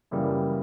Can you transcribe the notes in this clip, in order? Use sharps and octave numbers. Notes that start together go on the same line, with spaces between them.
F#2 C#3 E3 G3 A#3